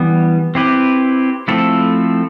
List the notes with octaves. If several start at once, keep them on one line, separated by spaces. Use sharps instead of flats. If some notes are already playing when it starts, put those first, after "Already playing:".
Already playing: E3 G3 B3
C4 E4 G4 B4
F3 A3 C4 E4 A4